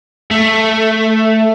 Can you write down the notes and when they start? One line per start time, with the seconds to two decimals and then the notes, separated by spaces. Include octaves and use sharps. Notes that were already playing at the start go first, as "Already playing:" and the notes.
0.31 A3